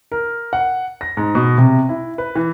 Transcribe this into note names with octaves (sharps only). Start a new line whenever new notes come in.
A#4
F#5
A#6
G#2
B2
C3
E4
B4
E3